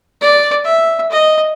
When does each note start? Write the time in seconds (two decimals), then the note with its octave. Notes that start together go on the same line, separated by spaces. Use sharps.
0.21 D5
0.64 E5
1.11 D#5